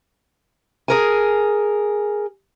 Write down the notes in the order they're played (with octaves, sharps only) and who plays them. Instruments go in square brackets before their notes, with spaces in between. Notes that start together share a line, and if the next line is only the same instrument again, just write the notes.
[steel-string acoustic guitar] G#4 A#4 G#5